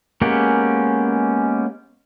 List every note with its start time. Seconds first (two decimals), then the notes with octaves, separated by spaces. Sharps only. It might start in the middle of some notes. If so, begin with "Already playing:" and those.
0.22 G#3 A#3 B3 C#4 G4